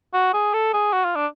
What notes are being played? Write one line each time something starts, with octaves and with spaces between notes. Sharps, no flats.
F#4
G#4
A4
G#4
F#4
F4
D4